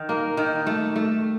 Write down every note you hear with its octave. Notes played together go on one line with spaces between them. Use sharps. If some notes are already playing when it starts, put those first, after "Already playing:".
Already playing: D#3
A#3
D#3
A3
A3